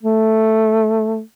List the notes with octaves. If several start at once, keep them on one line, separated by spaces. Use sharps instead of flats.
A3